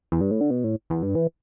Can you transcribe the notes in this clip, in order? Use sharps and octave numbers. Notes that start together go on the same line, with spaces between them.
E2
G2
A2
D3
B2
A2
E2
G2
E3